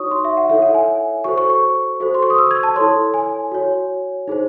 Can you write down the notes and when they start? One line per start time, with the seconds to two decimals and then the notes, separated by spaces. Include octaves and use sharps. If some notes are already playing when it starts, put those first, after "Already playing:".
Already playing: D#4 F#4 C#5 C#6 D#6
0.11 C6
0.25 E5
0.37 F#5
0.49 E4 A4 C#5 E5
0.62 F#5
0.74 G#5
1.24 F#4 A4 C5 C#6
1.38 C#6
1.50 C#6
2.00 F#4 A4 C5
2.14 C6
2.22 C#6
2.30 D#6
2.38 E6
2.51 G#6
2.63 A5
2.76 E4 A4 C#5 C6
3.14 G#5
3.52 F#4 C#5
4.28 D#4 G#4 C5